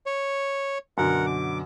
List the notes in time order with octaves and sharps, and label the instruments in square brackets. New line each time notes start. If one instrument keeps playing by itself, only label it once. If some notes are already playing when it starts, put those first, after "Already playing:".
[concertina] C#5
[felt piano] F#2 B2 D3 [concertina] A#4 F#5
[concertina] D6